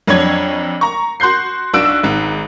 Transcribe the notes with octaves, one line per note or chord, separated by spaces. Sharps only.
F2 F#3 D4 C#5 G#6
A#5 C#6
F#4 C6 F#6 G6 C7
B1 D4 F#4 E6 F#6 D7
G#1 G#2